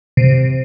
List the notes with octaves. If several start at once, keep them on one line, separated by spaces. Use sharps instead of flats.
C3